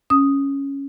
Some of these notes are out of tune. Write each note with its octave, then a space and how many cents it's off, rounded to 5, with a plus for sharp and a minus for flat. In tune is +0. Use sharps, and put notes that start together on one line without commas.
C#4 +0 D#6 +0